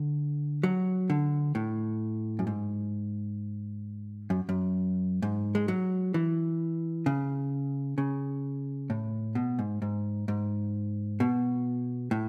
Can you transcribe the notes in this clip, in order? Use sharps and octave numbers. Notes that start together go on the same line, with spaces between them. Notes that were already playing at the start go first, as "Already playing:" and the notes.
Already playing: D3
F#3
D3
A2
F#2
G#2
F#2
F#2
G#2
G#3
F#3
E3
C#3
C#3
A2
B2
G#2
G#2
G#2
B2
A2